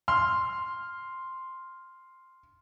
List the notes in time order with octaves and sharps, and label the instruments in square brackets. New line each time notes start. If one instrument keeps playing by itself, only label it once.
[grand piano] C6 F6